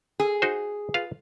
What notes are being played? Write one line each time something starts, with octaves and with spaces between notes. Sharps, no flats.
G#4
D#4 F#4 C5
F4 B4 F5